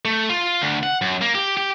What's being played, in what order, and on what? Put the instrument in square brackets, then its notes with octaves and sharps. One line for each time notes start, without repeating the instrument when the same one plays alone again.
[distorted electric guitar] A3
F4
D2
F#5
F#2
A#3
G4
G4